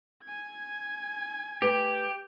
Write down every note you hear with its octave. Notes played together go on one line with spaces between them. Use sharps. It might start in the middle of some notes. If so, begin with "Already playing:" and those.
G#5 G#6
A3 G4 B4